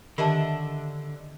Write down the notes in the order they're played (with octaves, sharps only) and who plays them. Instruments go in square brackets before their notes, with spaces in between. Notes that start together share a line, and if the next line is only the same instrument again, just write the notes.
[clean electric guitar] D3 [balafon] D#3 [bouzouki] D4 D#5 E5 [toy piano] G4 A5